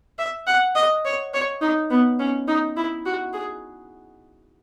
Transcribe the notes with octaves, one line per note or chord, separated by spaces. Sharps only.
E5
F#5
D#5
C#5
C#5
D#4
B3
C#4
D#4
E4
F#4
G#4